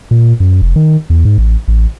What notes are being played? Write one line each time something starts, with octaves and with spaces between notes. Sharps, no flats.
A#2
F#2
F1
D#3
E2
G#2
A1
A1